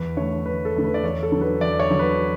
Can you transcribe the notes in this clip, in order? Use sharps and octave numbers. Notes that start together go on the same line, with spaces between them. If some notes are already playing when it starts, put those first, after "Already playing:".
Already playing: E2 B4
D3 A3 C#5
E2 B4
A4
D3 A3
B4
D5
E2 C#5
A4
D3 F#3
B4
E2 D5
C#5
D3 F#3
B4